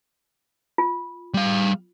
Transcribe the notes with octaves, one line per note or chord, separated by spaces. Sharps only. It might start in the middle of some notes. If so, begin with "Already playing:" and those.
F4
G3 F5